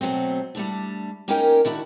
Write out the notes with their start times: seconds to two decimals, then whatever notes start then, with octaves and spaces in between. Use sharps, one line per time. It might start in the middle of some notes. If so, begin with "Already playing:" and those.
0.01 B2 F#3 A3 C4
0.55 G3 A3 D4
1.28 A#3 C#4 D#4 G4 A#4 G5
1.65 D#3 D4 E4 F#4